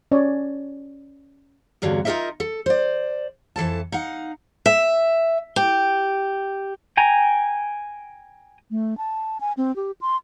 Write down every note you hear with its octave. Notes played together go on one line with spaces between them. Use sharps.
C#4 C#5 D5
E2 G2 D3 F#3 A#3
D#4 F4 G4 A#4 D#5 E5
A4
C5 D5
F2 E3 A4 A5
D#4 F5 F#5
E5
G4
G5 G#5 A#5
A3
A5
G#5
C4
G4
C6